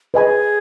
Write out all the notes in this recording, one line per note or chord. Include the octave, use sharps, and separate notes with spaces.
G#4 B4 D#5 G#5 B5